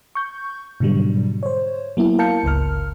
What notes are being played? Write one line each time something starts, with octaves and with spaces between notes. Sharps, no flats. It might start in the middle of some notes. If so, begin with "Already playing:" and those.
C#6 G6
G#2 B2 D3 F#3 G3
C5 C#5
F#3 A#3 B3 E4
A#4 F5 A5 G6 C#7
G1 C#2 A#4 F6